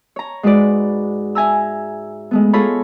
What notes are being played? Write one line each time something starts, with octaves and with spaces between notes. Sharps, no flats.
C#5 A#5
G#2 G#3 F#4 B4 D5
E5 G#5 A#5 E6
G#3 A3 B3
F4 G#4 A4 C#5 A#5 B5